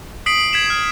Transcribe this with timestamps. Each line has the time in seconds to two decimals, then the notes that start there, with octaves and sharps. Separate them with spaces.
0.26 D#6 B6 C7 D7 F#7
0.53 G#6 B6 E7
0.66 F6 G#6